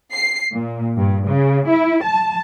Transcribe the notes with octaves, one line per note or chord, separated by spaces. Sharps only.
C7
A#2
G2
C#3
E4
A5